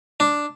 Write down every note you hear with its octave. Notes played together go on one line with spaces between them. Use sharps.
D4